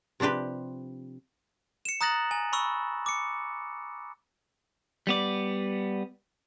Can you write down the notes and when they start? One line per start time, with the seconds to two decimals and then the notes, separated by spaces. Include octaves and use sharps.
0.20 C3 F3 D4 G4 B4
1.85 C#7 E7
2.01 A#5 D#6 F#6 A6 A#6 F#7
2.31 G#5
2.53 B5 C#6 E6
3.06 D6 C#7
5.07 G3 B3 D5